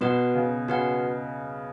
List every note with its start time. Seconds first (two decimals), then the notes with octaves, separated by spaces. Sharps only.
0.01 B2 F#4 B4 F#5
0.35 C#3
0.68 C#3 F#4 B4 F#5